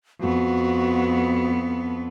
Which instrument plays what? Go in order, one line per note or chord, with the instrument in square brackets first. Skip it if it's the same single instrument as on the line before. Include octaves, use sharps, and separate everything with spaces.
[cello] F2 B3 [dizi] F#4